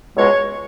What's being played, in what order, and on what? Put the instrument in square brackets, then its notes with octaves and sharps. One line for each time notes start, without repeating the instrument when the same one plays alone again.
[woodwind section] C#2 B2 G#3 C#5